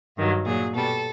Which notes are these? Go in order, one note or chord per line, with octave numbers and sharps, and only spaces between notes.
G2 D#3 F#3
A#2 F#3 G#4
B2 G3 A4